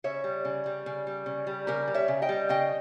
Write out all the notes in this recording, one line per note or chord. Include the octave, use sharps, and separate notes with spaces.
C#3 C#5 E5
G3
C#3
G3
C#3
G3
C#3
G3
C#3 G4 A#4
G3
C#5 E5
C#3
D#5 G5
G3
C#3 D#5 G5